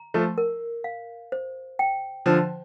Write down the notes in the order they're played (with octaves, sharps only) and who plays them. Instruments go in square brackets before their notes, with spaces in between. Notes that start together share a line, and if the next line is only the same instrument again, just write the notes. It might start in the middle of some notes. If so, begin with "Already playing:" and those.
Already playing: [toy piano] A#5
[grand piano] F3 A3
[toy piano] A#4
F5
C5
G5
[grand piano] D3 F3 [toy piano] C5